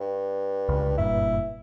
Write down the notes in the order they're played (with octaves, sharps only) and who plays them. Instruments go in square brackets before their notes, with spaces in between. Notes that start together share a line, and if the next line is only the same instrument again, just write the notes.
[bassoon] G2
[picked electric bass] C#2
[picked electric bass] F#1 G2 A#2 [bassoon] E4